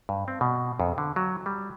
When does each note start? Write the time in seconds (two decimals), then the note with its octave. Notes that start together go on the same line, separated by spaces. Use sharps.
0.09 G2
0.28 C4
0.41 B2
0.80 F2
0.98 D3
1.16 F#3
1.46 G3